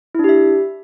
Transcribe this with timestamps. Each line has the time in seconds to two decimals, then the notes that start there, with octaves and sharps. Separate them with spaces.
0.15 E4
0.19 D4
0.24 G4
0.29 E5